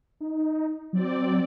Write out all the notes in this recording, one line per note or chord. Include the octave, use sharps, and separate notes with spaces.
D#4
F#3 C4 D5